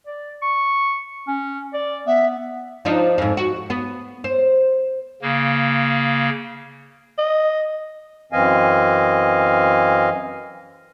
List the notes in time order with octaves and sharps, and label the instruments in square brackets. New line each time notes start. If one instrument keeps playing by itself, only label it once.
[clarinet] D5
C#6
C#4
D5
[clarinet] B3 [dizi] E5
[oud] F3 D4 D#4
F2 G#2
F#4
B3
C5
[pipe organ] C#3 A#3
[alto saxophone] D#5
[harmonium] F#2 E3 C4 D#5 F5 G#5